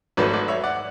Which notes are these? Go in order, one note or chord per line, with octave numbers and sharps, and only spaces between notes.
G#1 G#2 F#3 A3 B4 D5
B4 D5
C#5 E5
D5 F#5